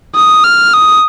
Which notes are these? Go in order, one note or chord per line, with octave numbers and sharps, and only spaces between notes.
D#6
F6
D#6